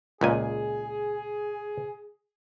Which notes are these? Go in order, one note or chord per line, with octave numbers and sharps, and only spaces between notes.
C#2 A#2 G#4 G#5